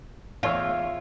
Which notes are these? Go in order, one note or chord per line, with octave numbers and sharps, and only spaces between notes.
E2 F4 C#5 E6